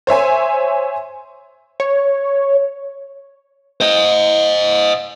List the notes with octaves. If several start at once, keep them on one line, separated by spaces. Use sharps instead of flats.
C5 C#5 E5 G#5
C#5
C5 D#5